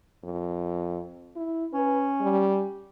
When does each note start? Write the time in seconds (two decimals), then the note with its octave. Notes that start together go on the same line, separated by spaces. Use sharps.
0.24 F2
1.36 E4
1.73 C#4 B4
2.21 G3